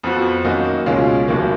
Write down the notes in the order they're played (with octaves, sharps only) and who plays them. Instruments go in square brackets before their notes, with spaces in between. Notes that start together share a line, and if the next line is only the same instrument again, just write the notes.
[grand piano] F2 F3 B3 F#4
F#2 D#3 A#3 D#4 F#4
C#2 B2 G#3 C#4 F4
F1 D#2 D#3 F#3 A#3